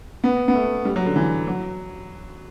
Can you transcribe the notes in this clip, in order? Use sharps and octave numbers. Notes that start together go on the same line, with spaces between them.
B3
B3
A3
G3
F#3
D3
E3
F#3